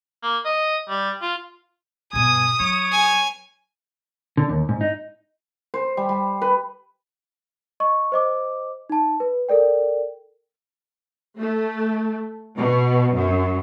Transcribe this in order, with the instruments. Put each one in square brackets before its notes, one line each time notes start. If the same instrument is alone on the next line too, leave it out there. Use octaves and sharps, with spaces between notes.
[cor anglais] A#3
D#5
G3
F4
[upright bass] G2 B2 [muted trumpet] G#5 [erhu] D#6
[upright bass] F#3 [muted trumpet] C#5
[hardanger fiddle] G#5
[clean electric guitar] D3
D#2
G#2
D#4
[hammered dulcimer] C5
G3
G3
B4
[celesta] D#5 C#6
C5 D#5 D6
D#4 A5
B4
A4 A#4 D5 G5
[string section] A3
B2
F#2